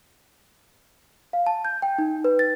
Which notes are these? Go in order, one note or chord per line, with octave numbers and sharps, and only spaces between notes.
F5
A5
G6
G5
D#4
B4
A6